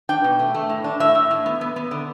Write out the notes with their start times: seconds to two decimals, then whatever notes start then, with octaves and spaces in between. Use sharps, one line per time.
0.09 D4 G5
0.24 B2
0.39 A3
0.54 A3
0.69 A2
0.84 D4
1.00 A2 E5
1.15 A2
1.31 A2
1.46 B3
1.61 B3
1.76 B3
1.91 D3